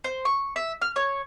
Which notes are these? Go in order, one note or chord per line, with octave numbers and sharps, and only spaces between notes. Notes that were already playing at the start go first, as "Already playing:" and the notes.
C5
C#6
E5
F6
C#5